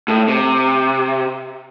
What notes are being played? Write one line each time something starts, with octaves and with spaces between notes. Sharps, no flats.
A2
C3